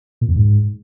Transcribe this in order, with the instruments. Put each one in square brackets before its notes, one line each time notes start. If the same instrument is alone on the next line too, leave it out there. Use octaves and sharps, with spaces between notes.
[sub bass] A#2
F2
G#2